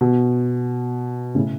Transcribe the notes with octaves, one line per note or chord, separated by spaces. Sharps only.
B2
A2 C#3